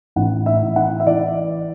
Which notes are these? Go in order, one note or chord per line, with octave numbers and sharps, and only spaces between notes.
A1 F#5
E5
E3
F#5
E5
E3 D5